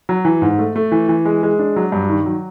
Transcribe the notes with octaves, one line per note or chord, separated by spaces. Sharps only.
F#3
E3
G#2
A3
A3
E3
E3
G#3
G#3
D4
F#3
G2
D#3
F#3